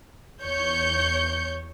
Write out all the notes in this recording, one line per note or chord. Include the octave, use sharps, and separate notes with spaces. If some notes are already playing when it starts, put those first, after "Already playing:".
E2 C#5 G6 C#7